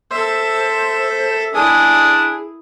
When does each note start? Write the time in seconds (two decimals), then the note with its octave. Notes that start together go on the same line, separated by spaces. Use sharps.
0.11 A4 C5 E5
1.55 D4 E4 G#4 D#6